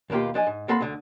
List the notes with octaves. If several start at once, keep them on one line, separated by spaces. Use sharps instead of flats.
D#2 B2 A#3 F4 G4
F3 D4 D#5 G#5
G#2
A#3 C4 A4 F#5 B5 C6
D2 D3